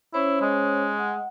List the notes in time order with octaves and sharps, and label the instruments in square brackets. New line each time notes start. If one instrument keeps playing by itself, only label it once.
[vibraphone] C#4 C5 C#5 [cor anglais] E4
[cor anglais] G#3
[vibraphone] F#5